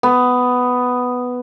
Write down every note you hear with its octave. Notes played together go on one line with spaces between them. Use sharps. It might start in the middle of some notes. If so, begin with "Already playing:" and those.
B3